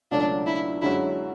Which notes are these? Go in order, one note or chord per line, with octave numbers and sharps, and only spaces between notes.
C#2 B2 F#3 A3 C#4 D4
E4
F#2 D3 G#3 C#4 E4 F#4